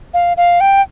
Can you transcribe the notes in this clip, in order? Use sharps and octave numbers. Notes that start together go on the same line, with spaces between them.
F5
F5
G5